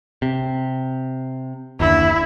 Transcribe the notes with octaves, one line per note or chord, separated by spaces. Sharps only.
C3
F#1 D#2 D3 E4